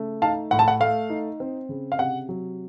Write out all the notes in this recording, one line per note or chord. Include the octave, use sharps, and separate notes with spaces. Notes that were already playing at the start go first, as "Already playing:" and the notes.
Already playing: C#3 A3
D#4 F5 A5
A2 F#5
A5
F#5
A3 F5
D#4
C4
C#3
F5
C3 F#5
F#3